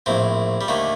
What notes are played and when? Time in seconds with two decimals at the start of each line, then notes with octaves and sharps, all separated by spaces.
0.06 A#1 A2 C4
0.61 G3
0.68 D#2 D3 A3